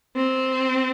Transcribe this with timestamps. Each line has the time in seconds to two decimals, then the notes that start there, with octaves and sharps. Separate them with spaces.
0.16 C4